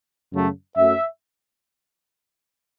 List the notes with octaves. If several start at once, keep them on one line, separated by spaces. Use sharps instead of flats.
F#2 C#3 F#3 A3
F#2 F#3 A3 E5